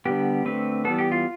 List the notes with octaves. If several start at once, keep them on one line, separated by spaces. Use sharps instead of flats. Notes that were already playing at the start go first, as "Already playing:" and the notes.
D3 G3 B3 G4
D3 A3 C4 B4
E3 G3 B3 A4
G4
F4